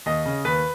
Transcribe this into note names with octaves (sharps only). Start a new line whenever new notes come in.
D#2 D#5
C#3
D#2 B4